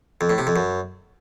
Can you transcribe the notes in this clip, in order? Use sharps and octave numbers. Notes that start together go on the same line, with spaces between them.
F2
A2
C3
F2
F#2